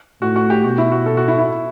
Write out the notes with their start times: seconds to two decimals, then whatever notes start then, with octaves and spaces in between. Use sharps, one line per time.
0.22 A2 F#4
0.36 F#4
0.50 G4
0.64 B2 F#4
0.78 E4
0.92 F#4
1.06 A4
1.17 F#4
1.28 E4
1.38 E4